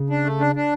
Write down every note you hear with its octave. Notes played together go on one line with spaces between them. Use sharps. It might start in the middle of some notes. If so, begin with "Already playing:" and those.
Already playing: C#3
D4
A3
D4
D4